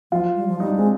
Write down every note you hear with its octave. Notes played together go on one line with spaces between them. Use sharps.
F3 F4
G3
F3
G3 D#4
D4
G#3 C4